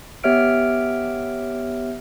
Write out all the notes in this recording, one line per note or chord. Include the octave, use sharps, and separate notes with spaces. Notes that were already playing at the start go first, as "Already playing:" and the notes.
B3 G4 C#5 E5 F6 D7